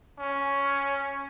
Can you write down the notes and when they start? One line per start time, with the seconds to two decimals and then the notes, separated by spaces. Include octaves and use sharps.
0.19 C#4